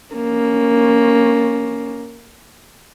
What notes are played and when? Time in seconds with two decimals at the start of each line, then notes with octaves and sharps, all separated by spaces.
0.14 A#3 C#4